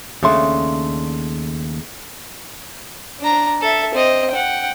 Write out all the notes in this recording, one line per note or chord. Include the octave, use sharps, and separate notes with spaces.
D#2 C#3 A3 D4 C6
D4 A#5
A4 E5
C4 D#5
F#5 G5